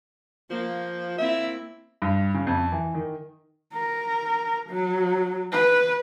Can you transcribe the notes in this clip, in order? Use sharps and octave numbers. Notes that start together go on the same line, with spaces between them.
F3 A#3
A#3 C4 E4 E5
G2
C#3
F2
E3
D#3
A#4
F#3
B4